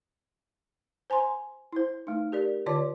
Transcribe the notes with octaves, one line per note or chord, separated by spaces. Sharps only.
C5 G#5 A#5 C6
E4 C5
A3 D#4
G4 A#4 D5
D3 F4 C#5 D5 A5 D6